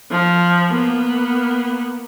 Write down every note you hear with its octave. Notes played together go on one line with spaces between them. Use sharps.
F3
A#3 B3